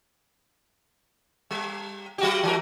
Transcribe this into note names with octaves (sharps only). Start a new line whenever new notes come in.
G3
F#3 F#4 G4
E3 G#3 A#4